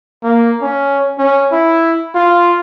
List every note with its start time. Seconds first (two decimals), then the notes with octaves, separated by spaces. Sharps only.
0.23 A#3
0.62 C#4
1.19 C#4
1.52 E4
2.15 F4